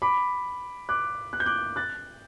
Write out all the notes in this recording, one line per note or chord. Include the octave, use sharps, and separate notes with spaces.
B5 D6
D6 F#6
F#6
G6
D6 F#6
F#6 A6